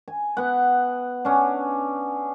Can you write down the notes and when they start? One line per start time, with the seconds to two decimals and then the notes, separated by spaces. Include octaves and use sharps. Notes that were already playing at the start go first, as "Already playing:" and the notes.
0.08 G#5
0.37 B3 F#5
1.25 C#4 D4